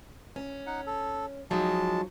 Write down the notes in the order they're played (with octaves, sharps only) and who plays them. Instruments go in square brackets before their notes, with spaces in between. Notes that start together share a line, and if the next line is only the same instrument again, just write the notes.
[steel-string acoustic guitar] C#4
[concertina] D#4 F#5
A4
[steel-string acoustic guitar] F3 F#3 D#4 [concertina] G#3 A5